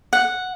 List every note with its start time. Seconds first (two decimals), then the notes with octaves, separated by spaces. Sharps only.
0.13 F#5